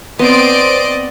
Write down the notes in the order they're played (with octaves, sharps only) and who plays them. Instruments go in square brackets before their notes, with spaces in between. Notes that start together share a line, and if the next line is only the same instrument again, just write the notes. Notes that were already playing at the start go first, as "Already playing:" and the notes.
[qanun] B3 [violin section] C4 C6 D7 [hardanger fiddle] D5 D#5